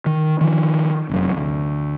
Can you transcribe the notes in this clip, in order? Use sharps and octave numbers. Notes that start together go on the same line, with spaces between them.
D#3
D#3 F3
F1 F#2
D2